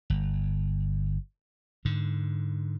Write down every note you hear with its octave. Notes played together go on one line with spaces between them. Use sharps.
G1
G#2 D3